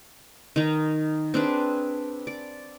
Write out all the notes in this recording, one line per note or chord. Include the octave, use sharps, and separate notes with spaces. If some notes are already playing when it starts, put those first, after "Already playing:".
D#3 D#4
C4 D4 G#4 B4
D5